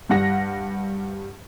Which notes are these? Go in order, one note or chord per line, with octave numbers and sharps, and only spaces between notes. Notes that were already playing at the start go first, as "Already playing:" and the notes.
G2 G3 F#5 A#6